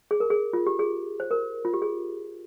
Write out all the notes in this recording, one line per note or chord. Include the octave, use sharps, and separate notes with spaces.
G#4
A#4
G#4
F4
G4
G#4
C5
A#4
F4
G4
G#4